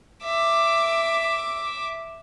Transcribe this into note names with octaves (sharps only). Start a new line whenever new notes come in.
E5 D6